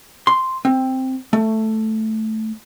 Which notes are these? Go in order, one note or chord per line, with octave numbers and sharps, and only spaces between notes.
C6
C4
A3